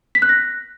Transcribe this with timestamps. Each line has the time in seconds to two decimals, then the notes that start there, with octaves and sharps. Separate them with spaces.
0.15 B6
0.22 F#6
0.29 A#6